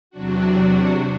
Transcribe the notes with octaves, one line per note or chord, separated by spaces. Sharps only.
E2 C3 F#3 D4 F#4